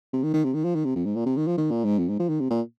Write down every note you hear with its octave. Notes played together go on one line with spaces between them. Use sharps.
C3
D#3
D#3
C3
D#3
F3
D#3
C3
F2
G#2
A#2
C3
D#3
F3
D#3
A#2
G#2
F2
G#2
F3
D#3
C3
A#2